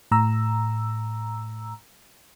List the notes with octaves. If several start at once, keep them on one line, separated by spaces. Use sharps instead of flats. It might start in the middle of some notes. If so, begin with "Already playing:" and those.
A2 A#5 E6